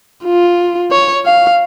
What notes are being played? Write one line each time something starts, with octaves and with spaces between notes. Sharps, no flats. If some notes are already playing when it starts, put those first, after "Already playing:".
F4
C#5
F5